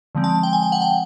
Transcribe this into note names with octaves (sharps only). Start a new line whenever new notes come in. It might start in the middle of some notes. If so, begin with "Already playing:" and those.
D3 F3 G#3 C4
A5
G5
G#5
G5
F#5
G5